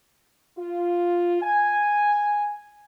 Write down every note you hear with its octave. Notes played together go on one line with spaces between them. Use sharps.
F4
G#5